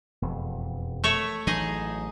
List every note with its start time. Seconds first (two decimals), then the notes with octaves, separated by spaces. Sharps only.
0.22 E1 F2
1.04 A3 C#5 E5
1.47 A1 E3 F#3 D#4 G#4 D#5